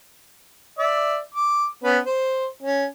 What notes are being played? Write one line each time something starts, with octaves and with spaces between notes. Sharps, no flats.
D5 E5
D6
B3 C#4 B4
C5
C#4